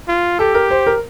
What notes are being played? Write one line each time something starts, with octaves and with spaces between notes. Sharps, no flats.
F4
G4 A4
A#4
C5
A#4